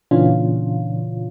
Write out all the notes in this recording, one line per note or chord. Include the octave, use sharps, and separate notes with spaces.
A#2 C#3 E3 C#4 D4 F4